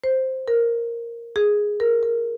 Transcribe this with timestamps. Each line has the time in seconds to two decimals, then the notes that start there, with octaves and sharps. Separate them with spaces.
0.04 C5
0.48 A#4
1.36 G#4
1.80 A#4
2.03 A#4